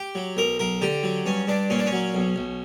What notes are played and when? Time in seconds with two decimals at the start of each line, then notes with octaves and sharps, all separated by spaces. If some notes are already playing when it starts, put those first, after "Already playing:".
Already playing: G4
0.15 F#3
0.37 B1 A#4
0.59 B1 A#4
0.81 D3 G4
1.03 F#3
1.26 G2 C#4
1.48 G2 D4
1.70 A#2 C#4
1.79 D4
1.86 C#4
1.92 F#3
2.15 B1
2.36 B1